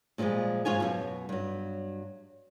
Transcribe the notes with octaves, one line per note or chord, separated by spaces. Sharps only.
A#2 D3 F3 G3 G#3
G#2 F3 F4 C#5 G#5
F#2 B2
G2 F#3